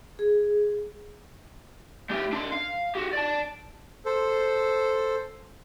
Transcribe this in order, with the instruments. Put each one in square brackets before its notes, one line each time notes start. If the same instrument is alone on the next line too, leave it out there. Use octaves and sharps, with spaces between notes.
[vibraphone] G#4
[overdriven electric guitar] A3 G4
D4 C6
F5
F#4 G4
D5 A5
[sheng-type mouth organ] A4 C5